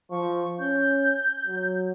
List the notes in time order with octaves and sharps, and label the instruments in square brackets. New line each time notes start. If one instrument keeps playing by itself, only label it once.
[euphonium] F3 [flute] C#6
[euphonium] C#4 [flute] G6
[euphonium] F#3